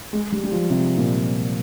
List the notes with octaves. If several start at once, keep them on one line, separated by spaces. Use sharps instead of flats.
G#3
G3
G3
F3
C3
A#2